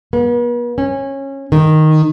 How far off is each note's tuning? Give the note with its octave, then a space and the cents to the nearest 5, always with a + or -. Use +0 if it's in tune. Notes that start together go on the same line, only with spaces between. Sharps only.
B3 -45
C#4 -20
D#3 +0